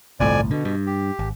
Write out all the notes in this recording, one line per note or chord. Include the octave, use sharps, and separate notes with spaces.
G1 C2 F2 A2 D5 G#5
B2 D3
G2
G4
G#1